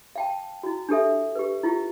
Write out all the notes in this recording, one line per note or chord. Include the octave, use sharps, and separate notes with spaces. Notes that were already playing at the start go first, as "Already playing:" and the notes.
F5 G5 A5
E4 F#4
D4 G4 A4 E5
G4 B4
E4 F4 G4